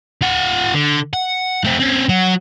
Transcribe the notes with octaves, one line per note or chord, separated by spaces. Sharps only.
F4 F#5
D3
F#5
A3 C4
C4 C#4
F#3 F#4